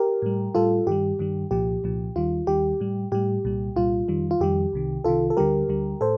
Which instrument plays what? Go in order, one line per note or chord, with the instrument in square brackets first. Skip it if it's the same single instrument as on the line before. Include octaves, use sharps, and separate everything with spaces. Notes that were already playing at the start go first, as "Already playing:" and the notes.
Already playing: [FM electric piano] G4 A#4
A2 G3
A2 G3 F4 A4
G2 D#3 G3 G4
G2 D#3 G3
C2 A#2 F3 G4
C2 A#2 F3
D#2 D#3 G3 F4
D#2 D#3 G3 G4
A2 G3
A2 G3 G4
C2 A#2 G3
C2 A#2 G3 F4
F2 D#3 G3
F4
F2 D#3 G3 G4
C2 C3 D#3
C2 C3 D#3 F4 A4
A4
D2 D3 G3 G4 A#4
D2 D3 G3
A2 A4 C5